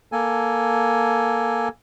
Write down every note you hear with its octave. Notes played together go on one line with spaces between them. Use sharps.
A#3 A4 G#5